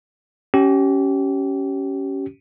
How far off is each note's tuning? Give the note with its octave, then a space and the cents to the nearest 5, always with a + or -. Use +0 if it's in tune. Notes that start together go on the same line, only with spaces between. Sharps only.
C#4 +0 G4 -30